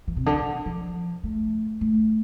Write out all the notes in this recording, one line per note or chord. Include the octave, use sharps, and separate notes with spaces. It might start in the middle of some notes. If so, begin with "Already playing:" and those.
E3
C3
D3
F3
A3
A3